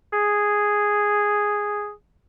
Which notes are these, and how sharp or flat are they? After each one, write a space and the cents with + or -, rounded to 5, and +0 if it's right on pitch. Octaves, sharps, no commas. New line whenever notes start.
G#4 -5